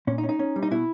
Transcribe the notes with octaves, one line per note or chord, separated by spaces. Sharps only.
A#2 C#4
D#4
C#4
D#4
C#4
G3
D#4
B2 E4